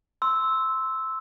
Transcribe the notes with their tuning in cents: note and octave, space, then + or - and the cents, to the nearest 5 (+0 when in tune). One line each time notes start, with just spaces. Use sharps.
C6 +0 E6 -10